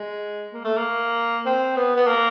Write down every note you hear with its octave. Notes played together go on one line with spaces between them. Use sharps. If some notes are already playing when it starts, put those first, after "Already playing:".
Already playing: G#3
A#3
A3
A#3
C4
B3
B3
A#3